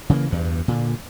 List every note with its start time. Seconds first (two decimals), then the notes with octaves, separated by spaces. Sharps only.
0.10 C#3 E3 F#3 A#3
0.30 E2 G2
0.68 A#2 D3